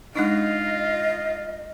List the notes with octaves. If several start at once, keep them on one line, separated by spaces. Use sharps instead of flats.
G#3 D4 D#4 F4 D#5